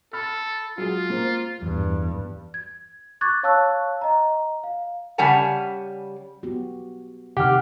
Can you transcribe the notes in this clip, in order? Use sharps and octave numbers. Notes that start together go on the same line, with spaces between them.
A4 B5 F6
F#3 G#3 F4 G#4
A#3 C5
E2 G2
G#6
C#6 D6 F#6 G#6 A6
C#5 F5 A5 C#6 E6 F#6
D#5 A#5
F5
C#3 G3 D5 F#5 G#5 A5
B3 F#4 G4
C3 D#3 G4 F#5 F6